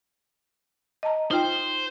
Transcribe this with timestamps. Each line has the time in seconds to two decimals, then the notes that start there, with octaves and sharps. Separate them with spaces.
1.03 D#5 A5 A#5
1.31 D#4 F4 C5 G5